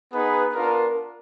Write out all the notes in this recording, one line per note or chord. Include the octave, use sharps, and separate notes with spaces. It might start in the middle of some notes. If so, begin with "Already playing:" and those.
B3 D#4 G#4 B4
B3 D4 F4 A#4